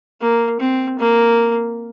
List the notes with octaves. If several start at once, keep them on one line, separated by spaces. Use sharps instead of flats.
A#3
C4
A#3